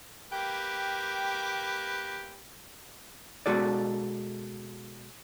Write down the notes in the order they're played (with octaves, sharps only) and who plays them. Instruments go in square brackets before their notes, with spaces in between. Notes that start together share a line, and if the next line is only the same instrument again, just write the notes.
[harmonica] A#3 G4 B4 [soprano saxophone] G5
[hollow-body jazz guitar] B2 G#3 F#4 A4 D5